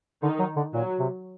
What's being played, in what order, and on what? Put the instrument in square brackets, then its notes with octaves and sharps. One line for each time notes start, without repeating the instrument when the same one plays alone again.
[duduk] D3 [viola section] D#3 D#4
[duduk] F#3
D3
[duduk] A#2 [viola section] F#3
[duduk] C3